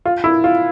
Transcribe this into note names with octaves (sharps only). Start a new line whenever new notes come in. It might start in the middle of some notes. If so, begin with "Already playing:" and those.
F4
E4
F4